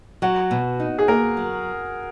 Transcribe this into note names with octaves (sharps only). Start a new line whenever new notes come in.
F#3 F#4
B2
D#4
G#4
A#3 A#4
F#3